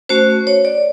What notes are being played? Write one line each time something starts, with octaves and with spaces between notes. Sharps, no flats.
A3 C#4 F#4 C5
C#5
D5